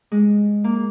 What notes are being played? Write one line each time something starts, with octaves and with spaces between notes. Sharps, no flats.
G#3
A#3